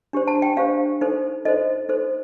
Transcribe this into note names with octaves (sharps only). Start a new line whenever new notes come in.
D4 G4 C5
A5
G5
D4 G4 C5 F5
D#4 A4 C5
D#4 A4 C5 D#5
D#4 A4 C5